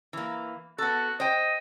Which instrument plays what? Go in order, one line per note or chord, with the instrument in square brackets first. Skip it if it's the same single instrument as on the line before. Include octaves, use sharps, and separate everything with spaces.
[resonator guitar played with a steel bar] E3 A#3
[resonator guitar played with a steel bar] B3 A4 [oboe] F#4
[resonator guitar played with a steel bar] C5 G5 [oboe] D#5